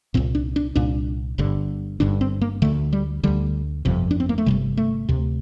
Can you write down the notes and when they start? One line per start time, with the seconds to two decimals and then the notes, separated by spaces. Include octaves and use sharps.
0.14 C2 A#2 C4
0.35 D4
0.56 D4
0.75 C2 A#2 D4
1.38 G1 G2 D3
2.00 G1 G2 D3 D4
2.21 C4
2.41 A#3
2.62 D2 D3 A3
2.93 G3
3.23 D2 D3 G3
3.85 G1 F2 C3
4.11 D4
4.20 C4
4.29 A#3
4.38 A3
4.46 G1 F2 C3 G3
4.77 A3
5.09 D2 C3